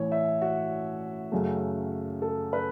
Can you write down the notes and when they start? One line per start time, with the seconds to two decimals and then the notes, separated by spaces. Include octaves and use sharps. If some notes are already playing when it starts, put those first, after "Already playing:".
Already playing: A1 A2 E3 C#5
0.12 E5
0.42 F#4
1.32 F#2 C#3 F#3 A3
2.22 A4
2.53 B4